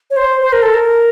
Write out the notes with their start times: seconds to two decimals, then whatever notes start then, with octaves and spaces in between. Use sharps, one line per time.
0.10 C#5
0.16 C5
0.41 C5
0.52 A#4
0.62 A4
0.74 A#4